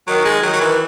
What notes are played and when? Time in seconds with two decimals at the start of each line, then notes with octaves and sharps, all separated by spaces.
0.07 D#3 F#3
0.25 G#3
0.43 D#3 F#3
0.53 F#3
0.61 E3